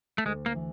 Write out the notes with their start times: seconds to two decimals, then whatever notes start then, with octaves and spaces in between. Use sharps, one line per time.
0.18 A3
0.25 D2 G#3
0.46 A#3
0.55 E3